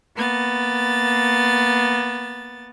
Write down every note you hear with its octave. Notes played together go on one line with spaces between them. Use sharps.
A#3 B3 A6